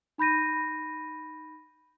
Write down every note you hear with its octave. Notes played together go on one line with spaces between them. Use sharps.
D#4 B5 G6 A#6 D#7